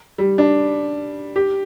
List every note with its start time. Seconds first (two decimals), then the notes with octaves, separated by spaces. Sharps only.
0.18 G3
0.38 D4
1.36 G4